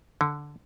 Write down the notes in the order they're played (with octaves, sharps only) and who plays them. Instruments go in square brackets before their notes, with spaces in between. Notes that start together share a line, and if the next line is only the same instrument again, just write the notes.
[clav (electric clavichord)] D3